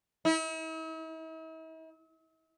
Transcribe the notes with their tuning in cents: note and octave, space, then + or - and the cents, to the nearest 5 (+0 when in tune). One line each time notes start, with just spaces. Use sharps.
E4 -45